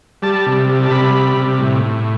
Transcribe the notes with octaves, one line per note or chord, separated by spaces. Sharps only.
G3 A5
C3
G3
A5
C3 B5
G3
C3
A2
A2